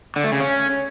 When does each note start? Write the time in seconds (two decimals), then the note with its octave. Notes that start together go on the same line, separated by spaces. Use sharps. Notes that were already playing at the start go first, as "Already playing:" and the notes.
0.16 D3
0.24 A3
0.32 C#3
0.40 C#4